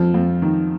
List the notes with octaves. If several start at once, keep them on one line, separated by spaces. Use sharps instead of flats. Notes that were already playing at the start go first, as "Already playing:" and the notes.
Already playing: F2 F3
F2
D#3